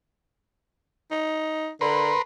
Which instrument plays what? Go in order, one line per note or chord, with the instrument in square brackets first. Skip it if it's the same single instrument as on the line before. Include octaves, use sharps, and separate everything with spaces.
[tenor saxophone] D#4
[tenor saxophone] D3 [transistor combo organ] A#4 B4 C6